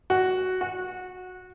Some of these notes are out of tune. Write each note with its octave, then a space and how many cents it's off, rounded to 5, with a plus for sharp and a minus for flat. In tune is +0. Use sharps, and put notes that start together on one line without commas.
F#4 +5
F#4 -15